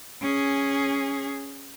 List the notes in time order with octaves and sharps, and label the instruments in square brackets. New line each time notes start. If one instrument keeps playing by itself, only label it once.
[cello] C#4 G#4